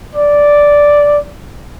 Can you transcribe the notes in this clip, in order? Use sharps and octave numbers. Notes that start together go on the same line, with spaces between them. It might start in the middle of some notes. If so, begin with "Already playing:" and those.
D5